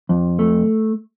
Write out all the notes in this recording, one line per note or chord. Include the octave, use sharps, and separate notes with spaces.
F2
A3